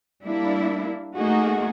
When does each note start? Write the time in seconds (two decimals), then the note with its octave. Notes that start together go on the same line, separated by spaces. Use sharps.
0.23 G3 A#3 D4 E4
1.17 A3 A#3 D#4 F#4 G#4